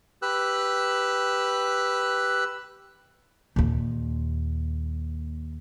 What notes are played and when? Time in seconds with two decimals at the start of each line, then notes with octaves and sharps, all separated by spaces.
0.22 G4 B4 E6 F#6
3.56 D#2 A#2